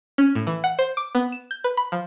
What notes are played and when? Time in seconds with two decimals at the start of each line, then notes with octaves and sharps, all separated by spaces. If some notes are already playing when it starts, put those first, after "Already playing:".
0.18 C#4
0.35 A2
0.47 E3
0.64 F#5
0.79 C5
0.97 D6
1.15 B3
1.32 E7
1.51 G6
1.64 B4
1.77 B5
1.92 F3